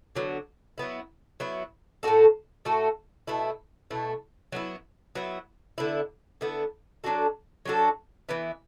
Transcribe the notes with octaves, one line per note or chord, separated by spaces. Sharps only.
D3 F#3 B3
F#3 B3 E4
F#3 B3 E4
A2 A3 F#4 A4
A2 A3 F#4 A4
B2 A3 E4
B2 A3 E4
F#3 B3 E4
F#3 B3 E4
D3 B3 E4
D3 B3 E4
F#3 D4 F#4 A4
F#3 D4 F#4 A4
E3 B3 E4